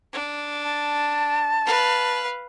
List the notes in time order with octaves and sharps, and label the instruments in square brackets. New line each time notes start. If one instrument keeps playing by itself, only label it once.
[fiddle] D4
[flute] A5
[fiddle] B4 F5